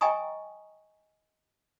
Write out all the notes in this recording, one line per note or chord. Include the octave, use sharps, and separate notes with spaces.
D#5 G5 G#5 A#5 C#6 D#6